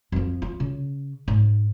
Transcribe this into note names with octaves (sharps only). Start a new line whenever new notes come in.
F2 F3
F4
C#3
G#2